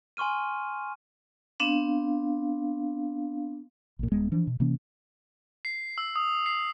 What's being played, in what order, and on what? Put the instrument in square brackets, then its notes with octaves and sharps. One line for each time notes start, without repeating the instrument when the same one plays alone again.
[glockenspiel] G#5 C6 C#6 F6 D#7
[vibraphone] B3 C4 D4 F5
[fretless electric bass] A#1 A#2
D#1 G#3 B3
E3 F3 D4
B2
C3 E3 A#3 C#4
[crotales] C7
E6
D#6
C7